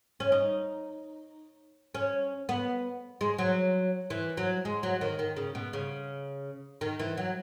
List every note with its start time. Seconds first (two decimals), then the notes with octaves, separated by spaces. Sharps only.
0.20 C#4
0.32 D#4
1.95 C#4
2.49 B3
3.21 G#3
3.38 F#3
4.10 E3
4.37 F#3
4.65 G#3
4.83 F#3
5.01 D#3
5.19 D#3
5.37 C#3
5.55 B2
5.73 C#3
6.81 D#3
6.99 E3
7.17 F#3